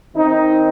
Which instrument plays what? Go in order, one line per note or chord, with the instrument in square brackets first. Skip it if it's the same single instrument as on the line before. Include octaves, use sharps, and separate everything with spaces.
[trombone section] D#3 C4 D#4